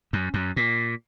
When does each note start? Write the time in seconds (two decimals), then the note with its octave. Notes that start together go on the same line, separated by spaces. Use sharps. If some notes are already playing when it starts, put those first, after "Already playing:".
0.13 F#2
0.34 F#2
0.56 A#2